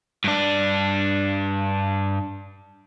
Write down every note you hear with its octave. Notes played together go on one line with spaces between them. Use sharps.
G2 D4